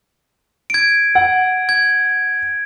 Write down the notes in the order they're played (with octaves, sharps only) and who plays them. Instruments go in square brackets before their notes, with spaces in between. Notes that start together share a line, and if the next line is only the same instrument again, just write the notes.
[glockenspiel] G#6 D7
[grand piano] F#5
[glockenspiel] G#6